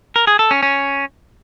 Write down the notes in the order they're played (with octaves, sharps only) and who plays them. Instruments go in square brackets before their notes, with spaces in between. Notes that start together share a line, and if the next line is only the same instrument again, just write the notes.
[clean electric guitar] A#4
G#4
A4
C#4
C#4